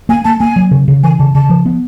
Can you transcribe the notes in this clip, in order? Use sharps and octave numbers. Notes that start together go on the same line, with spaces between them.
A#3 G#5
A#3 A5
A#3 G#5
F#3
C#3
C#3
E3 G#5
C#3 A5
C#3 A5
F3
B3